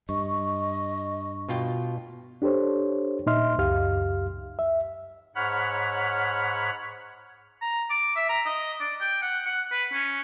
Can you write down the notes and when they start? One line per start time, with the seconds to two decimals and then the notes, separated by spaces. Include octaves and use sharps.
0.09 G2 D#5 C#6
1.49 B2 F4 G5
2.42 D4 G4 A4 C5 C#5
3.26 A#2 D#4 D#5 E5 C6 F6
3.58 C#2 F#2 G4 F5 F6
4.59 E5
5.35 G#2 C#5 F#5 B5 F6
7.61 A#5
7.90 D6
8.16 E5
8.29 A#5
8.46 D#5
8.80 D5
9.00 G5
9.22 F#5
9.46 F#5
9.71 B4
9.92 C#4